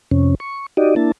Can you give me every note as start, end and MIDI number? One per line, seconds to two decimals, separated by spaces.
0.11 0.35 41
0.11 0.35 48
0.11 0.35 61
0.40 0.66 85
0.77 0.95 63
0.77 0.95 66
0.77 0.95 67
0.77 0.95 74
0.77 0.95 75
0.96 1.12 58
0.96 1.12 62
0.96 1.12 64
0.96 1.12 81